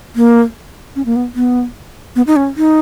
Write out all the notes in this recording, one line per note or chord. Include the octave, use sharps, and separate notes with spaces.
A#3
C#4
A#3
B3
B3
B3
D#4
C#4
D#4